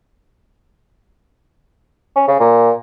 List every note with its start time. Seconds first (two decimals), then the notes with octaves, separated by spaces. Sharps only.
2.16 C#4
2.28 C#3
2.40 A#2